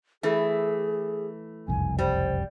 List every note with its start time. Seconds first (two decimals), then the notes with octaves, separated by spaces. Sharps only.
0.23 E3 A3 G#4
1.68 F#1 C2 F2 G#5
1.99 G3 C5